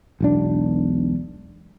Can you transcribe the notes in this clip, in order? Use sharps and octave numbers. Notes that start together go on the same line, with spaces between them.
E1 B1 D4